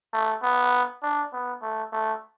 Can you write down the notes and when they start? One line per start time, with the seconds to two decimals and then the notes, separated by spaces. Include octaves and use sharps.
0.13 A3
0.42 B3
1.02 D4
1.33 B3
1.62 A3
1.92 A3